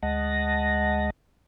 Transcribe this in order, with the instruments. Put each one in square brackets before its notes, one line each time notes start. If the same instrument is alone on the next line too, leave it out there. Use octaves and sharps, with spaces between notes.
[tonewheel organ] D2 G#3 D#5 F#5 A5 A#6